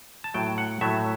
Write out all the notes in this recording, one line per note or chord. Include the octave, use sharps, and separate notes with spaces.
A5
A2 F#3 A3 G5
F#5
A2 F#3 A3 E5